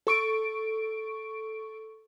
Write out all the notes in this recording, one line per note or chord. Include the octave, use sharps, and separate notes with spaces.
A4 C#6 D7